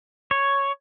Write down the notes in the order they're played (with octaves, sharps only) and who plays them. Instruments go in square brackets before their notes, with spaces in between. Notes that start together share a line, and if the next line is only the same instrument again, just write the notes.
[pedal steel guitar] C#5